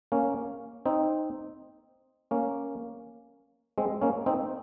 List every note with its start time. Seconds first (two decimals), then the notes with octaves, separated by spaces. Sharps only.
0.12 A#3 C#4
0.86 C4 D#4
2.31 A#3 C#4
3.78 G#3 C4
4.02 A#3 C#4
4.26 C4 D#4